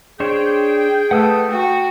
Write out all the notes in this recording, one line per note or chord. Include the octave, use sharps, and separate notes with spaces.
D4 G#4 C5 C#5 G5
A3 B4 F#5 D#6 E6
F#4 G5